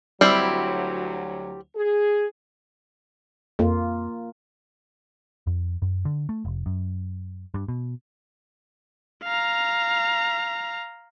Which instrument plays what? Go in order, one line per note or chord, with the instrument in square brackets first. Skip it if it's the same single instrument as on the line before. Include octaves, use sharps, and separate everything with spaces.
[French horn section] D2 F#3 [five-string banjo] G3 C4 E4
[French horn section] G#4
[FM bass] F2 [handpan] A#3 F4
[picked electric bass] F2
F#2
D3
A3
F1
F#2
G2
B2
[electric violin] F5 A#5